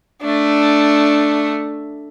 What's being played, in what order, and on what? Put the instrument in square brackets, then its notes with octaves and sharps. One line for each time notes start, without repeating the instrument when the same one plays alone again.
[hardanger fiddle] A3 D4